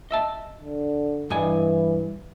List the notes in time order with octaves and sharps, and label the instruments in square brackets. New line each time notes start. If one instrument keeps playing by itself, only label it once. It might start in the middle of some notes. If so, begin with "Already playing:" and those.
[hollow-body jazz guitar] D#5 E5 A5
[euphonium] D3
[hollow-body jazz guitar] G2 D#5 G#5 [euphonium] E3